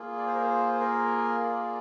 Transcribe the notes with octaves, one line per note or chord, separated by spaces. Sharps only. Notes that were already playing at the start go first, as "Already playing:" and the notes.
Already playing: A#3 F4 G#4
D5
C5
A#4
C5
C5
A#4
D5